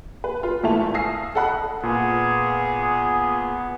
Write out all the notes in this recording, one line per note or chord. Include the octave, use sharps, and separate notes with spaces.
B4
F4 B4
G#1 E2 A3 E4 A5 F7
F5 G#5 D#6 E6 A#6 C7
A4 D#5 F#5 B5 F#6
A#2 B3 G#4